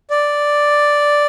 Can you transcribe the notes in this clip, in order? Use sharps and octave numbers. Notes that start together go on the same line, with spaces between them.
D5